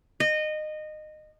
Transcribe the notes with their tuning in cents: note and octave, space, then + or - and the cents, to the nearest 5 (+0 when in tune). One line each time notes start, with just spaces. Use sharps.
D#5 -20